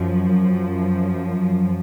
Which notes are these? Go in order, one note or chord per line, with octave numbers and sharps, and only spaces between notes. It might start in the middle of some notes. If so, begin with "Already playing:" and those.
Already playing: F#2 F3